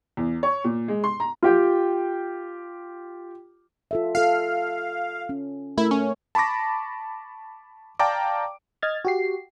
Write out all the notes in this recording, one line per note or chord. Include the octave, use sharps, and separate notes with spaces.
E2
C#5
A#2
G#3
C6
A#5
F4 G4 G5
F4 A4 E5
F4 A4 F5
C#4
A3 E4 A#4
C#4
A5 B5 C#6 D6 A#6
D5 F5 G5 A5 A#5 D6
D#5 F6 G#6 A6
F#4 G4 C7